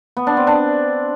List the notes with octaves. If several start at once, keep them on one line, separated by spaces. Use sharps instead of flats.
B3
D4
C4
D4